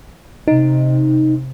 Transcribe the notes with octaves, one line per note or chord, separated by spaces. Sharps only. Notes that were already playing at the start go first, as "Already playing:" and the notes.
C3 D#4